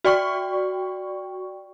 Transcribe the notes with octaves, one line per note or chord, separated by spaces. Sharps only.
F#4 D5 G5 C#6